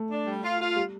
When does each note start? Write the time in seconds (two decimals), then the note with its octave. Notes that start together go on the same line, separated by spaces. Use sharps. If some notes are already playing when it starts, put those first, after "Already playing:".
Already playing: A3
0.10 D4
0.26 G3
0.43 F4
0.60 F4
0.76 G3